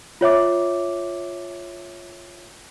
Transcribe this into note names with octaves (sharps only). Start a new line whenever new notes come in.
F4 C#5 E5 D6